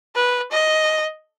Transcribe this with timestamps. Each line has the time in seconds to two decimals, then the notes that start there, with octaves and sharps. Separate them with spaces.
0.16 B4
0.52 D#5